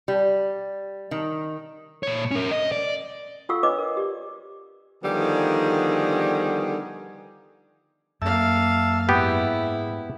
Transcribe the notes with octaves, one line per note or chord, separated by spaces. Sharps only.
G3
D#3
A#2 C#5
C#4 A#4
D#5
D5
F4 A4 F5 F#5 C#6 E6
D4 B4 C#5 D#5 D6
A#4
G4 D5
D3 D#3 F3 G3 B3 G#4
F#2 A#3 E5 F5 A5 E6
G#2 B3 E4 G4